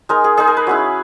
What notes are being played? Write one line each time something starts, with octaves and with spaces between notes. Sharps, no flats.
G#3 D#4 A#4
G#4
G#3 D#4 G#4
A#4
B4
F#3 C#4 E4